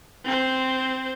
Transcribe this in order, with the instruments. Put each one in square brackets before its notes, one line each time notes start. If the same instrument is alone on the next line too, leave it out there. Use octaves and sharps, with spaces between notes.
[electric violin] C4 C5